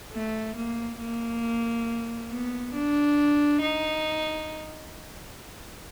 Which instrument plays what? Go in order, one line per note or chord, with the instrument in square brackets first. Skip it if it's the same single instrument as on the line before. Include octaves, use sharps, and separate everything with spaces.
[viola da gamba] A3
A#3
A#3
B3
D4
D#4